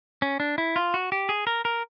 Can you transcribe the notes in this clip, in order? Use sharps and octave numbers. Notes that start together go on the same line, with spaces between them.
C#4
D4
E4
F4
F#4
G4
G#4
A#4
A#4